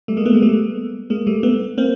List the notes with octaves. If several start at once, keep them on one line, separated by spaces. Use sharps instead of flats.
G3 A3
G#3 A#3
A3 B3
G#3 A#3
G3 A3
G#3 A#3
G3 A3
A3 B3
A#3 C4